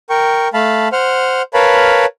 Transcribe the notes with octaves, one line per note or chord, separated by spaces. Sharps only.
A#4 G5 C#6
A3 F5 A5 B5
C5 F#5 F6
A#4 B4 C#5 F5 A5 B5